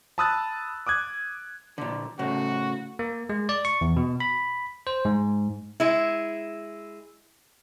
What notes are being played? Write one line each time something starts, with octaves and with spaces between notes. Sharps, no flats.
A5 B5 D#6 E6 F#6 A6
D6 D#6 F#6 G#6
A#2 D3
A2 C#3 F#4
A#3
G#3
D5
C#6
E2
B2
B5
C5
G#2
G#3 E4